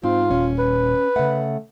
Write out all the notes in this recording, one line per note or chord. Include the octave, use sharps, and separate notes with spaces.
G#2 C4 F4
D#1 C#4
B4
C#3 A3 F#5